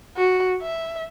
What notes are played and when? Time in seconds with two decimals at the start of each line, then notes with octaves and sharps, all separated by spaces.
0.17 F#4
0.62 E5